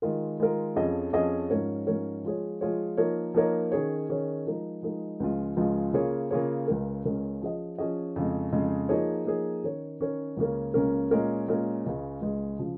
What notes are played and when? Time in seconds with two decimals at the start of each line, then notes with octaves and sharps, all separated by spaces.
0.02 D#3 G#3 F4 A#4
0.40 D#3 G#3 F4 A#4
0.76 F2 F3 C#4 G#4 D#5
1.13 F2 F3 C#4 G#4 D#5
1.50 G#2 F3 C#4 A#4 C#5
1.87 G#2 F3 C#4 A#4 C#5
2.24 F3 G#3 F4 G#4 C#5
2.61 F3 G#3 F4 G#4 C#5
2.97 F3 A#3 D#4 A#4 C#5
3.34 F3 A#3 D#4 A#4 C#5
3.72 D#3 C#4 G#4 C#5
4.09 D#3 C#4 G#4 C#5
4.46 F3 G#3 D#4 A#4
4.83 F3 G#3 D#4 A#4
5.20 C#2 C#3 F3 G#3 F4
5.56 C#2 C#3 F3 G#3 F4
5.93 C#3 A#3 F4 G#4 C#5
6.31 C#3 A#3 F4 G#4 C#5
6.68 C#2 C#3 G#3 C#4 A#4
7.05 C#2 C#3 G#3 C#4 A#4
7.42 F3 C#4 G#4 D#5
7.78 F3 C#4 G#4 D#5
8.16 F2 C#3 G#3
8.52 F2 C#3 G#3
8.89 F3 A#3 D#4 G#4 C#5
9.26 F3 A#3 D#4 G#4 C#5
9.63 D#3 C#4 A#4 C#5
10.00 D#3 C#4 A#4 C#5
10.37 C#2 C#3 A#3 C#4 A#4
10.74 C#2 C#3 A#3 C#4 A#4
11.11 A#2 G#3 C#4 A#4
11.48 A#2 G#3 C#4 A#4
11.84 C#2 C#3 G#3
12.22 C#2 C#3 G#3
12.59 C#3 F3